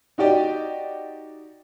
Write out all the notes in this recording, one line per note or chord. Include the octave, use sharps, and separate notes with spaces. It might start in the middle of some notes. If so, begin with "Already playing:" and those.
D#4 F#4 G4 D5 D#5